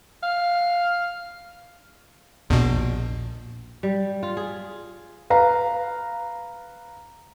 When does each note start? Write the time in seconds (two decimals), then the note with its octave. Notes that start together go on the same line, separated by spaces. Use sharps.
0.23 F5
2.50 A#1 E2 B2
3.83 G3
4.23 F4
4.37 G#4
5.30 B4 F5 A#5